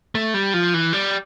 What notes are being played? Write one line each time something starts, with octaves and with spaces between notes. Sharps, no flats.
A3
G3
F3
E3
G3